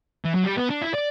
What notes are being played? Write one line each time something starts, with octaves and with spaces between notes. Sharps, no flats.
E3
F#3
G3
B3
D4
E4
D5